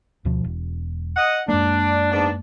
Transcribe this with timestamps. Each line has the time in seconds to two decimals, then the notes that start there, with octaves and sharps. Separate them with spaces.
0.25 D2 B2 F3
0.44 E1
1.16 D#5 F#5
1.48 F#2 G#3 A#3 D4
2.12 G#2 B3 D4